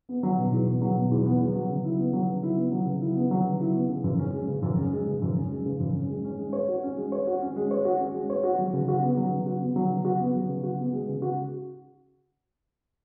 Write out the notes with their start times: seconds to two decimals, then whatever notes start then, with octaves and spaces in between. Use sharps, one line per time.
0.09 B3
0.23 F#3
0.38 B2
0.53 E2
0.67 B3
0.82 F#3
0.96 B2
1.11 E2
1.26 B3
1.40 F#3
1.55 F#3
1.69 C#3
1.85 E4
1.99 B3
2.13 F#3
2.29 C#3
2.43 E4
2.57 B3
2.72 F#3
2.86 C#3
3.01 E4
3.15 B3
3.31 F#3
3.46 C#3
3.60 E4
3.74 B3
3.89 C#3
4.04 F#2
4.19 C#4
4.33 G#3
4.48 C#3
4.62 F#2
4.77 C#4
4.93 G#3
5.06 C#3
5.22 F#2
5.37 C#4
5.50 G#3
5.66 C#3
5.80 F#2
5.94 C#4
6.10 G#3
6.25 C#4
6.38 G#3
6.53 C#5
6.68 F#4
6.83 C#4
6.97 G#3
7.12 C#5
7.27 F#4
7.42 C#4
7.56 G#3
7.71 C#5
7.85 F#4
8.00 C#4
8.14 G#3
8.30 C#5
8.44 F#4
8.59 F#3
8.73 C#3
8.88 F#4
9.03 B3
9.17 F#3
9.32 C#3
9.46 F#4
9.61 B3
9.76 F#3
9.90 C#3
10.05 F#4
10.20 B3
10.34 F#3
10.49 C#3
10.63 F#4
10.79 B3
10.92 G#3
11.08 C#3
11.22 F#4